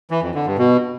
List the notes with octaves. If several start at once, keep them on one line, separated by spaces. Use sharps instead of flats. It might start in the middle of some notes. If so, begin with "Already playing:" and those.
E3
F2
D3
G2
B2